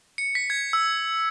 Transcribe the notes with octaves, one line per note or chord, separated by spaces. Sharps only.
C#7
B6
G#6
E6